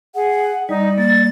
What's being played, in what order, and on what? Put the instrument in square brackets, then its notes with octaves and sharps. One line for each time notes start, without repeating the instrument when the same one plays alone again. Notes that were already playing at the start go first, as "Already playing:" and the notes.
[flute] G#4 [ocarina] F#5
[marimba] G3 [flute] D#4 [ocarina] D5
[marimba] A#3 [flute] A6